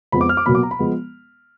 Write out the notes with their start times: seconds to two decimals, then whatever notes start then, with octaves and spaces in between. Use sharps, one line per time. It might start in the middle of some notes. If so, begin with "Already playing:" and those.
0.12 F2 F3 G#3 B3 B5
0.21 D6
0.29 F6
0.37 D6
0.46 B2 F#3 A#3 B5
0.55 D6
0.63 A#5
0.71 B5
0.79 F3 G#3 B3